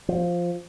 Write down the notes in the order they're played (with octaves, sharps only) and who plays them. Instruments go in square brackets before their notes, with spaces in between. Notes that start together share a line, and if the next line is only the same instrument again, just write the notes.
[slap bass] F3